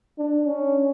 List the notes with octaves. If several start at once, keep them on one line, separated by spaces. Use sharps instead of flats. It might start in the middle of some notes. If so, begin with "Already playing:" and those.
D4
C#4